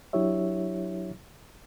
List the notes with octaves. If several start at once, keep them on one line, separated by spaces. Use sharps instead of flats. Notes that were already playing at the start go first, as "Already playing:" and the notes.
F#3 D4 E4 G4 C#5 E5